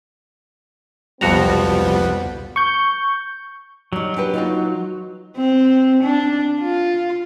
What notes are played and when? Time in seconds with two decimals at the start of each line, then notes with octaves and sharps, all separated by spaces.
1.21 C2 F2 F3 G3 B3 F#4 A#5
2.56 C#6 G6
3.93 F#3 G3 D#4
4.16 D4 G4 B4
4.33 D#4 F4 F#4
5.37 C4
6.03 D4
6.61 F4